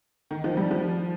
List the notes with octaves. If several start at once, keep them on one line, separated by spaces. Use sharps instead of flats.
D#3
F3
G3
F3